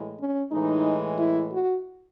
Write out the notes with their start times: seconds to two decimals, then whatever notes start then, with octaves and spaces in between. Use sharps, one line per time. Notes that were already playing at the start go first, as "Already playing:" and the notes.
Already playing: A2 E3 G#3
0.20 C#4
0.52 A2 E3 G#3 D#4
1.19 E4
1.52 F#4